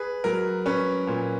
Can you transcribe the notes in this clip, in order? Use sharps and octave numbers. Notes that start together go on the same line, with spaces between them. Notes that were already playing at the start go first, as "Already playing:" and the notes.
Already playing: G#4 B4
F#3 A#4
C#4 B4
A#2